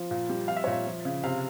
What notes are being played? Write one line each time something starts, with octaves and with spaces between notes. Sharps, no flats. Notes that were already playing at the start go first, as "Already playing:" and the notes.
Already playing: F3
A#2
G3
F3 F5
E5
C#5
A#2 E5
F3
C#3
C3 F5